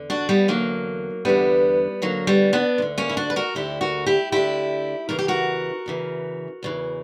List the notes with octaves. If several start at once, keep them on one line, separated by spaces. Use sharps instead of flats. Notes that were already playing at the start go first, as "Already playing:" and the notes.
Already playing: E2 D3
D4 F#4
G3 B3
E2 D3 F#3 A#3
E2 D3 G3 B3
D2 D3 F#3 A#3
G3 B3
B3 D4
D2 D3
A#3 C#4
E4
D4 F#4
B4
F#4 A#4
D2 D3 E4 G4
F#4 A#4
E4 G4
D2 D3 E4 G4
E2 C#3 E3 A#4
G4
F#4 A#4
E2 C#3 E3
E2 C#3 E3